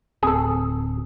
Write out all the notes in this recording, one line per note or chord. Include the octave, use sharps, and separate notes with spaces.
D1 C4 G#4 A4